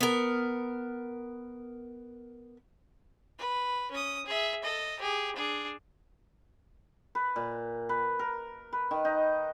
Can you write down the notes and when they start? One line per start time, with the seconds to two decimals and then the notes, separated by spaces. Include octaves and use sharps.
0.01 B3 A#4
3.39 B4
3.91 C#4 D#6
4.26 G#4 E5
4.64 A4 D#5
4.99 G4 G#4
5.36 D4 G#4
7.15 B4
7.36 A#2
7.89 B4
8.19 A#4
8.73 B4
8.91 D#3
9.05 D#4